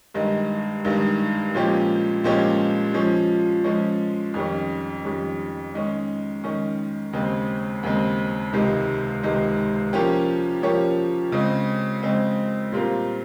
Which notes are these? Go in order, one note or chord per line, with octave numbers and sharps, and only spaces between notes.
G2 D#3 G#3 D#4
G2 D#3 G#3 D#4
A#2 F3 G#3 C#4 G4
A#2 F3 G#3 C#4 G4
F3 G#3 C#4
F3 G#3 C#4
F2 D#3 G3 C#4
F2 D#3 G3 C#4
D#3 G#3 C#4
D#3 G#3 C#4
D#2 C#3 G#3 C4
D#2 C#3 G#3 C4
C#2 C3 D#3 G#3
C#2 C3 D#3 G#3
F3 A#3 C#4 G4 C#5
F3 A#3 C#4 G4 C#5
C#3 G#3 C4
C#3 G#3 C4
A#2 G3 C4 F4 A#4